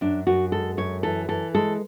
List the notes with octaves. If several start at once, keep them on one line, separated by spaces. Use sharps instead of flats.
F#2 D4
F#2 F#4
G#3 A4
F#2 C#5
E3 A4
E3 A4
G#3 A4